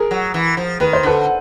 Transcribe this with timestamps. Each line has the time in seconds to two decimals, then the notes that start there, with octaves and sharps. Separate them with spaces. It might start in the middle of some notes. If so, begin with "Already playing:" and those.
Already playing: G#4 A#4
0.11 F#3
0.34 E3
0.57 F3
0.80 D#3 B4
0.93 C5
1.03 D3 A4 B4